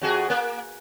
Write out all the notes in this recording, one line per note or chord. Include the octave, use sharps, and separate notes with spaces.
F2 F#4 G#4
A#3